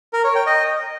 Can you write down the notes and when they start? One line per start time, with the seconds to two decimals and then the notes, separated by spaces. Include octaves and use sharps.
0.13 A#4
0.24 C#5
0.35 G5
0.46 D#5